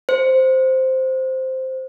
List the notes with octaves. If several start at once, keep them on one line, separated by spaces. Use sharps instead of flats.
C5